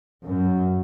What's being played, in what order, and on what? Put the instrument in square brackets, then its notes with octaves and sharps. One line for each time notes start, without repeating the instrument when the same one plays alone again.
[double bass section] F#2